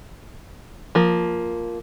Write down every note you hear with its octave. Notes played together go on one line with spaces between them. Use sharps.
F3 A#3